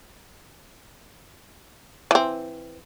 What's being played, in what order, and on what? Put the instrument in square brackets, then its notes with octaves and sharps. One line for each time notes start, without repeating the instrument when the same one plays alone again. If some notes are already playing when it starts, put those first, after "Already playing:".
[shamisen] E3 C4